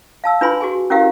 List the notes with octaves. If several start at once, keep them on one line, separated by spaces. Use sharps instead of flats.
F5 A5 E6
D4 F4 B4 G#5 B5 C6
F#4 G#4 G#5
C#4 E4 F#4 G4 A#4 F5